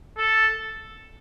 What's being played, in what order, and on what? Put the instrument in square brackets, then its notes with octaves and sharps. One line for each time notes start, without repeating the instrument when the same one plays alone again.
[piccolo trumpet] A4